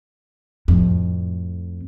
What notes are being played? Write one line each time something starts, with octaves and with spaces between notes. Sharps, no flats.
F2 A2